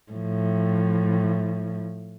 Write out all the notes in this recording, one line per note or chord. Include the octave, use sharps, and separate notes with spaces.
A2 F3